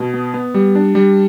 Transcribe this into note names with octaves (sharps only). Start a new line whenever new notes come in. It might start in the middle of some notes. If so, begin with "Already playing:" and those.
Already playing: B2
B3
B3
G3
D4
G3